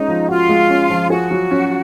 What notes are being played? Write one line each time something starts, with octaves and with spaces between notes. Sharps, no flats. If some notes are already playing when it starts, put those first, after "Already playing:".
Already playing: G#3 C#4 D#4
F3
F4 F#4
G#3
C#4
F3
F#4 G#4
F#3
C#4